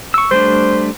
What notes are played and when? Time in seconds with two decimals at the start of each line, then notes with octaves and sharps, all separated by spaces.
0.14 C#6 E6
0.31 G3 A3 D4 C5